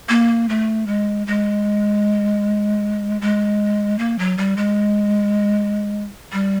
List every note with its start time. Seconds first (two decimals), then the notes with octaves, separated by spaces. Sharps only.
0.09 A#3
0.49 A3
0.87 G#3
1.27 G#3
3.21 G#3
3.99 A#3
4.19 F#3
4.38 G3
4.57 G#3
6.32 G3